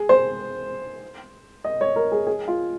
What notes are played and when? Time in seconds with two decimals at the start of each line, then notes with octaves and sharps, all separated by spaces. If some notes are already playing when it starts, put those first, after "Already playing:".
Already playing: G#4
0.09 C5
1.64 D#5
1.81 C#5
1.96 A#4
2.12 G#4
2.27 G#4
2.48 F4